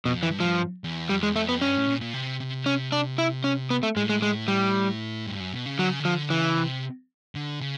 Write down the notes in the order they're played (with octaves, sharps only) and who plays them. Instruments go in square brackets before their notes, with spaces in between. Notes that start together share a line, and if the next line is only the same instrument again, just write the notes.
[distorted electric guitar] F2 [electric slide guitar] B2
[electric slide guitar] E3
[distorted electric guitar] G2
[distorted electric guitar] G#2 [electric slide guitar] F3
[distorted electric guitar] G2
E2
[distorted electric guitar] F2 [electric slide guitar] G3
[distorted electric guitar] E2 [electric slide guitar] G#3
[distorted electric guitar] F2 [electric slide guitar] A3
[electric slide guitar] B3
[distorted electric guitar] G2 [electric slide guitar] C#4
[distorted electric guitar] A2
A#2
A#2
C3
C3
[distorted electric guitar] C3 [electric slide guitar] C#4
[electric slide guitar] D4
E4
C#4
B3
A3
[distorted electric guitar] A2 [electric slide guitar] G#3
[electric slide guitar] G#3
G#3
G3
[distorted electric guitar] G2
F#2
B2
C#3
[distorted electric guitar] D3 [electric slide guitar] F#3
[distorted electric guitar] C#3
[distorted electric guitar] D3 [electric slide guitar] F3
[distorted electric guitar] C#3 [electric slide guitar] E3
[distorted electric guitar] C3
D3
C#3